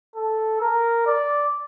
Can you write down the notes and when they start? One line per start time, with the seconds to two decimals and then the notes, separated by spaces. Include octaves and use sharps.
0.16 A4
0.61 A#4
1.06 D5